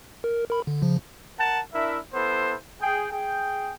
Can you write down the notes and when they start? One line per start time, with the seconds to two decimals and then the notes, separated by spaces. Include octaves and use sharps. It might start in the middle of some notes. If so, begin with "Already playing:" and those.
0.24 A#4
0.50 A#4 B5
0.67 D3
0.82 C#3 F3
1.38 A#4 F#5 A5
1.74 D4 E4 A#4 E5
2.14 B3 E4 A4 C5
2.81 G#4 G5
3.11 G#4 G5